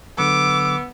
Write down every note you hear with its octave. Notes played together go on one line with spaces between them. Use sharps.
D3 F#3 B3 D6 E6